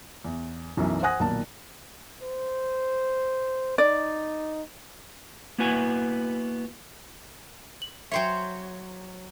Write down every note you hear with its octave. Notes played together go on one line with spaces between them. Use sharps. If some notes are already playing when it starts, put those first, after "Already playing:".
E2
B1 F#2 E3
C5 F#5 G#5 D#6 F#6 A#6
B1 A#2 D#3 A5
C5
D#4 D5
A#3 B3 E4 F#4 B4 G#5
F#7
F#3 C5 C#5 E5 G5